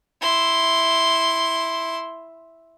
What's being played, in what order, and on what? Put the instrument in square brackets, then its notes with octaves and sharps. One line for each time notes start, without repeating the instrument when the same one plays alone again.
[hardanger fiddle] E4 C6